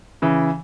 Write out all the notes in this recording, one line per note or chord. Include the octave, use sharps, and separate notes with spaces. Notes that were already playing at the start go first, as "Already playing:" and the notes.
C#3 E3